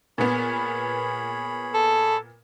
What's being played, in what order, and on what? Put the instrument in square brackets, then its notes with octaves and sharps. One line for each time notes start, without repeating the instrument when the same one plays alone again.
[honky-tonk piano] A#2 B3 [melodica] G#4 C#5 B5
[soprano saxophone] A4